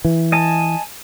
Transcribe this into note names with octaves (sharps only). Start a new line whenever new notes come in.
E3
D#5 G#5 A5